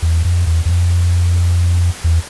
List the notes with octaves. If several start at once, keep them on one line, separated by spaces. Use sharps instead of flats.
E2
F2
E2
E2
F2
E2